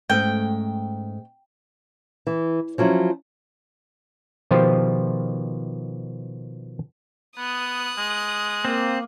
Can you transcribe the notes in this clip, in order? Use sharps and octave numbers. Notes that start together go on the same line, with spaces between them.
G#2 A3 C#4 G5
E3
F3 F#3 C#4 E4
B2 D#3 F3 F4 G4 C5
B3 D#6 F#6
G#3
A#3 C4